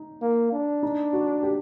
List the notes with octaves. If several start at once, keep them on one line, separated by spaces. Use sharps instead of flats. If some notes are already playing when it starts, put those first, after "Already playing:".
Already playing: D#4
A#3
D4
D#4
F#4
G4